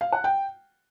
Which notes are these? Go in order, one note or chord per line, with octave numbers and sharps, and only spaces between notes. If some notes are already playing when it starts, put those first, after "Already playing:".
F5
F#5
G5